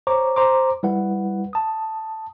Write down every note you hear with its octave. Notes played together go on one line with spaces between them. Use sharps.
C5 C#5 A#5 C#6 D6
C5 A#5 C6 D6
G3 E4 B4 F#5
A5 D#6